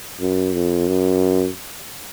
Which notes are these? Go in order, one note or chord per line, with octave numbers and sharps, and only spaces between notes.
F#2
F2
F#2